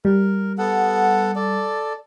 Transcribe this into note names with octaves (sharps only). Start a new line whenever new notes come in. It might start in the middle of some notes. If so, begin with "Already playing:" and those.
G3 A#4
B3 A4 F#5
A4 D5